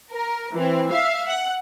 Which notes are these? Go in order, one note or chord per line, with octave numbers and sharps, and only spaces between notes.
A#4
E3 C4
E5 F5
F#5